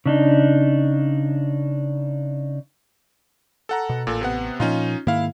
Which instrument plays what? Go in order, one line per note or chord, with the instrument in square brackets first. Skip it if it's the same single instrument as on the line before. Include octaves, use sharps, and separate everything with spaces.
[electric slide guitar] C#3 D4 D#4
[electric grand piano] A4 F#5 A#5
[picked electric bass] B2
[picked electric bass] A1 [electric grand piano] A#2 A4
[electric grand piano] C3 B3 F#5
[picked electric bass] A#2 F3 [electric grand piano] C#4 D#4 F4
[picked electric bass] G#2 D#3 A#3 [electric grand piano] E4 F5